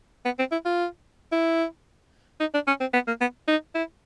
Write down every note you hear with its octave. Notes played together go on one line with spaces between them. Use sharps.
B3
C4
E4
F4
E4
D#4
D4
C#4
C4
B3
A#3
B3
D#4
E4